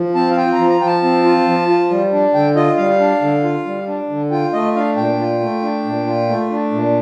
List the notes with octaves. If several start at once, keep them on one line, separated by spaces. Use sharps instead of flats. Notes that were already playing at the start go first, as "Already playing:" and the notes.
Already playing: F3
C4 A5
F5
F4 G5
A#5
F3
A#5
F3 G5
A5
C4
F4
F3
F4
G3
D4
D3 G5
F4 D#5
G3 F5
D4
D3
F4
G3
D4
D3
F4 G5
A3 D#5
D4 F5
A#2 G5
F4
A3
D4
A#2
F4
A3
D4
A#2